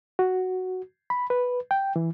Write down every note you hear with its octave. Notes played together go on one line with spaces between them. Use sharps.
F#4
B5
B4
G5
E3